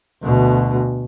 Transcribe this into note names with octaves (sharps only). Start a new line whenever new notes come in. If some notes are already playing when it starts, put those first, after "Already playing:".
D2 B2